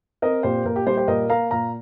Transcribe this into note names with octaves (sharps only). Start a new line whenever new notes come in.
C4 A#4 D#5
A#2 G4 C5
A#2 A#4
G4
G3 G4 C5
G4 C5
A#2 A#4 D#5
A#3 F5 A#5
A#2 F5 A#5